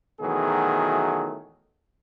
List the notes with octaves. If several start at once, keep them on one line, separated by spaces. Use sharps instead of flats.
B2 D#3 E3 F#3 A3 G#4